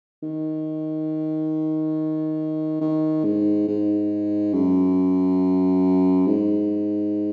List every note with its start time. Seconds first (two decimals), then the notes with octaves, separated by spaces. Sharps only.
0.23 D#3
2.81 D#3
3.24 G#2
3.67 G#2
4.53 F#2
6.27 G#2